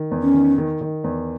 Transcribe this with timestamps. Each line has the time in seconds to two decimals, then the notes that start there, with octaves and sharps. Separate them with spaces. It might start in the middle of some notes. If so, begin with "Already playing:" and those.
Already playing: D#3
0.11 E2
0.22 C#4
0.34 D#3
0.58 D#3
0.81 D#3
1.04 E2